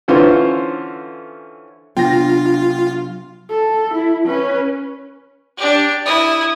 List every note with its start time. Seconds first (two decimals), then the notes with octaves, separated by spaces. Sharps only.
0.08 D3 E3 C#4 F4 C5
1.97 C3 F#3 B3 D4 F4 G5 A#6
3.49 A4
3.93 E4
4.25 C#4 B4
5.57 D4 G4
6.05 E4 D#6